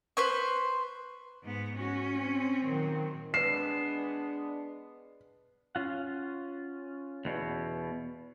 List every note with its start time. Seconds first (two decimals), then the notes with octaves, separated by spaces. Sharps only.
0.17 B4 C5 C#6
1.43 G#2 B3
1.76 C#4 F#4
2.20 C4
2.63 A#2 D#3 F#3
3.34 G#3 B3 D4 B4 C7 E7
5.75 C#4 F4 F#5
7.25 E2 B2